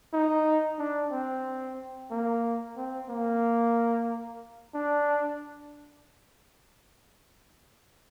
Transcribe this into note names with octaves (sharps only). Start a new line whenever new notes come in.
D#4
D4
C4
A#3
C4
A#3
D4